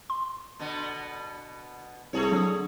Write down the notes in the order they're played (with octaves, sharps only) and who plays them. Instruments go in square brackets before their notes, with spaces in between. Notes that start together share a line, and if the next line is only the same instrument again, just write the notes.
[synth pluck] C6
[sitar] B2 D3 B3
[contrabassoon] C2 [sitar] A3 G#4 C#5
[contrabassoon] D3 [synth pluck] F#3 D#6